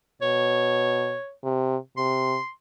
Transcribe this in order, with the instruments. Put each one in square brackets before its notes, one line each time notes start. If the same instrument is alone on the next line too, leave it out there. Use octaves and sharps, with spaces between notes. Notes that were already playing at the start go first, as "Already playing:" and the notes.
[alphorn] B2 [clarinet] C#5
[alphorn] C3
[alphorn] C3 [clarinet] C6